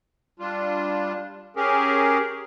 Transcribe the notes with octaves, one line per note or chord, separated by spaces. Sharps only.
G3 D4 F4
C#4 G4 G#4 A#4